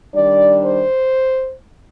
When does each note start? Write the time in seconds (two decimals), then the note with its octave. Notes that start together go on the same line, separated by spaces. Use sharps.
0.15 D#3 G3 D4 D5
0.64 C5